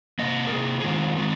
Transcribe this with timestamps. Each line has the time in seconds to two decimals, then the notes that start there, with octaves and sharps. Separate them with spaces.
0.19 C3 F3 A#3 D#5
0.47 A#4
0.52 C3 F3 A#3 G#4
0.80 G#4
0.84 D#3 G#3 C4 F4
1.17 D#3 G#3 C4